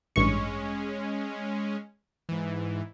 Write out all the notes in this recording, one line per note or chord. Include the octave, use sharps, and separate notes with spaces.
A1 G2 G#3 C#4 C#6
G#2 E3